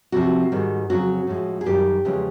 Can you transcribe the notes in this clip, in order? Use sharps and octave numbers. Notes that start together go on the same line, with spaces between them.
D2 C3 F3 F#4
G#2 D#3 G3
F2 C#3 F#3 F#4
A2 F3 G#3
G#4
F#2 D#3 G3 G4
E2 C#3 F3 G#3